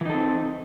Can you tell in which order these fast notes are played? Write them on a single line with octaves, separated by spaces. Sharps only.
E3 D#4 A4 C4